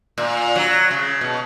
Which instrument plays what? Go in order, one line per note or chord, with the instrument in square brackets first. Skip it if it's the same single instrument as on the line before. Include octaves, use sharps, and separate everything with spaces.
[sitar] A#2
F#3
C#3
B2